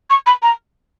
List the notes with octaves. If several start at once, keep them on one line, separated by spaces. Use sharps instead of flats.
C#6
B5
A#5